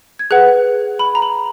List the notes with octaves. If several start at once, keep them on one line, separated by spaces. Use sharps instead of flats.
G#6
G#4 B4 F#5 F#6
B5
A#5
B5